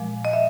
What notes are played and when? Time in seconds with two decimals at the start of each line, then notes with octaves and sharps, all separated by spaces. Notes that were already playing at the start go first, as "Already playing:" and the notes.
Already playing: A#2 F3 G#3
0.25 D#5
0.33 E5